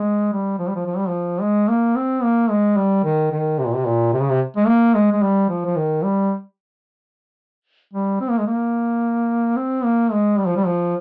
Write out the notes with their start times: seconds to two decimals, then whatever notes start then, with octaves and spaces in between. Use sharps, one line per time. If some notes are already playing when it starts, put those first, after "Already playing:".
Already playing: G#3
0.32 G3
0.59 F3
0.68 G3
0.75 F3
0.87 F3
0.97 G3
1.08 F3
1.41 G#3
1.69 A#3
1.96 C4
2.23 A#3
2.50 G#3
2.77 G3
3.04 D#3
3.32 D#3
3.59 C3
3.67 A#2
3.75 C3
3.86 A#2
4.13 C3
4.21 C#3
4.30 C3
4.57 G#3
4.67 A#3
4.94 G#3
5.12 G#3
5.22 G3
5.49 F3
5.65 F3
5.76 D#3
6.04 G3
7.93 G3
8.20 C4
8.30 A#3
8.38 G#3
8.47 A#3
9.57 C4
9.84 A#3
10.12 G#3
10.39 G3
10.47 F3
10.56 G3
10.66 F3